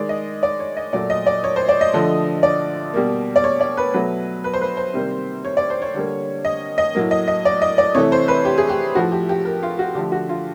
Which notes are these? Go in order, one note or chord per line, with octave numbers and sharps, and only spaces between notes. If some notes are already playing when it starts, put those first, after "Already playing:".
Already playing: D#3 G#3 D5
D#5
D5
C#5
D#5
A#2 F#3 A3 D5
D#5
D5
C#5
C5
D5
D#5
D3 F3 A3
D5
B2 G3 A#3
D5
C#5
D5
B4
B2 F#3 A3 B4
B4
C5
B4
C5
C3 D#3 G3 A#3
C#5
D5
C5
C#5
D3 G3 A#3
D#5
D#5
A2 F#3 A#3
D#5
D#5
D5
D#5
D5
C3 E3 A3 C#5
C5
B4
G4
G#4
G4
A2 F3 A3 F#4
G4
G4
A#4
F4
F#4
D3 F3 A3 G4
F#4
F4